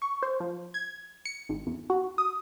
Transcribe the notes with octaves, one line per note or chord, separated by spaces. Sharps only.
C#6
C5
F3
G#6
C#7
G#1
E2
F#4
D#6